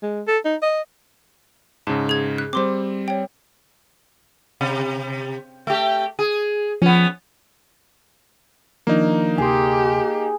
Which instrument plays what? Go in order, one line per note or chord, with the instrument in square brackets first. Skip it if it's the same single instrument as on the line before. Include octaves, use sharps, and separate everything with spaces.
[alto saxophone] G#3
A4
D#4
D#5
[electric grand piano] G#2 C#3 [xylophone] A5
[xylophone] G#4 G#6
F#6
[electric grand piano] G3 C4 [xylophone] C5 C6 D6
[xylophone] C#5 G5
[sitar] C3
A3 G4
G#4
[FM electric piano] F3 [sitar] B3 C#4
[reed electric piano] D#3 F3 D4 [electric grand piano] A#3 D#4
[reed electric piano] D2 C3 C6 [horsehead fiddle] G4 [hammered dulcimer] G#4